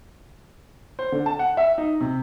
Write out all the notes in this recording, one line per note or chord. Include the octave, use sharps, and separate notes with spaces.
C5
D3
A5
F#5
E5
D#4
C3